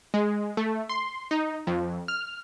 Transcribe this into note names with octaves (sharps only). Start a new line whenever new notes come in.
G#3
A3
C6
D#4
F2
F6